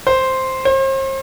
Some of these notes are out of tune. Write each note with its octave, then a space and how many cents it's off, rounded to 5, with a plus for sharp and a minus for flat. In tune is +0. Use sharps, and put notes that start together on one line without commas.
C5 +0
C5 +40